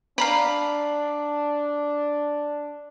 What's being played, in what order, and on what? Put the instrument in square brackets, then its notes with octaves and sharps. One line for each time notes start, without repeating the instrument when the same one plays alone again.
[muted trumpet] D4 [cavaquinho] F5 A#5 B5